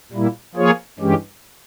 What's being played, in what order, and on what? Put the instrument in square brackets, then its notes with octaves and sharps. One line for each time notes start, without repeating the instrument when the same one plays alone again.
[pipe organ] A#2 G3 A#3 E4
F3 A#3 F4 G#4 C#5
G2 E3 G#3 C#4 G4